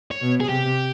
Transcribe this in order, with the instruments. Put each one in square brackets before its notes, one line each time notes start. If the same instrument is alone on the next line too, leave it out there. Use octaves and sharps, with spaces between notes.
[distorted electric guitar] C#5
[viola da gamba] B2
[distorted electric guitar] G#4
[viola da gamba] C3 [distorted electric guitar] G4